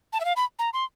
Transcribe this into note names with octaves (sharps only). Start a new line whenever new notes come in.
A5
E5
F5
B5
A#5
C6